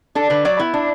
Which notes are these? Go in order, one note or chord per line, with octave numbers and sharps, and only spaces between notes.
D4 A4
D3 B4
F#3 D5
B3 E4
D4